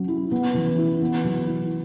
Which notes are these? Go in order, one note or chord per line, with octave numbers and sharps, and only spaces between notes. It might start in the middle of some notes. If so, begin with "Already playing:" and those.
Already playing: F#3 C#4
E4
B3
E3
E4
B3
F#3
E4